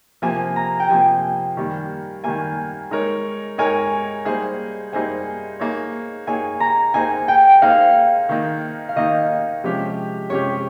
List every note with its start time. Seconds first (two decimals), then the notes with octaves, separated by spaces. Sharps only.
0.22 C3 F3 A#3 G#5
0.56 A#5
0.80 G5
0.90 C3 F3 A#3 G#5
1.57 D#3 G3 A#3
2.24 D#3 G3 A#3 G#5
2.91 G#3 D#4 A#4 C#5
3.58 G#3 D#4 A#4 C#5 G#5
4.25 G3 A#3 D#4 G#4 C5
4.93 G3 A#3 D#4 G#4 C5 G#5
5.60 A#3 D#4 G#4 C#5
6.27 A#3 D#4 G#4 C#5 G#5
6.60 A#5
6.94 A#3 D#4 G#4 C5 G#5
7.28 G5
7.62 A#3 D#4 G#4 C5 F5
8.29 D#3 A#3 D#4
8.89 F5
8.96 D#3 A#3 D#4 D#5
9.64 C3 F3 G#3 C#4 G4
10.30 C3 F3 G#3 C#4 G4 C#5